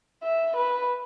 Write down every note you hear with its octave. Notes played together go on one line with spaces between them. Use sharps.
E5
B4